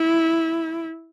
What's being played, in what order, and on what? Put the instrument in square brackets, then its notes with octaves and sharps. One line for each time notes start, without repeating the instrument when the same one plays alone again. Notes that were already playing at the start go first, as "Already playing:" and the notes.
Already playing: [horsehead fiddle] E4